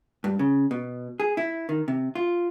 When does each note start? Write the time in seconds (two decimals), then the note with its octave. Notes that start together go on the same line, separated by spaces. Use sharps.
0.24 G2
0.39 C#3
0.71 B2
1.20 G#4
1.37 E4
1.69 D#3
1.88 C3
2.15 F4